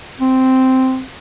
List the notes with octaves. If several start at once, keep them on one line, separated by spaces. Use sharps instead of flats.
C4